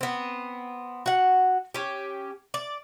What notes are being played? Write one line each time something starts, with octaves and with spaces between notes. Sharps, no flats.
B3 C4
F#4 F#5
C#4 G4
D5